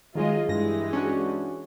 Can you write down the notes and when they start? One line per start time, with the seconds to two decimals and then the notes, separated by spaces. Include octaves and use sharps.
0.15 D#3 F#3 G#3 F4 G#4 D#5
0.49 G2 E3 G#3 G4 A#6
0.93 C#4 D4 F#4